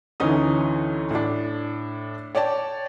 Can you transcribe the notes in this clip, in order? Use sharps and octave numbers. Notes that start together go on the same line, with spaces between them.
D2 E3 C#4 D#4 D#6
A2 D4
C#5 D5 G5 A5